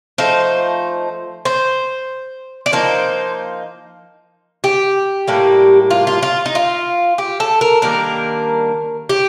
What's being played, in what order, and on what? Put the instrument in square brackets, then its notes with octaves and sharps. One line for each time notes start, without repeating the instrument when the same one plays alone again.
[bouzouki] F3 A3 D#4 C5
C5
D5
F3 A#3 D#4 C5
G4
A2 G3 A#3
F4
F4
F4
D#4
F4
G4
A4
A#4
D#3 G3 A#3 D4 A#4
G4